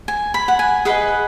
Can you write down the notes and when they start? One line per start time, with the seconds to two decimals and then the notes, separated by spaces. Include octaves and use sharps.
0.08 G#5
0.34 B5
0.48 F#5
0.59 G#5
0.85 G#4 B4 D#5 F#5